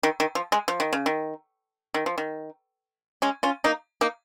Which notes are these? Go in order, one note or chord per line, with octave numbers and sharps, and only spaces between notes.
D#3
D#3
F3
G#3
F3
D#3
C#3
D#3
D#3
F3
D#3
G#3 C#4
C#4 F4
A#3 D#4
A#3 D#4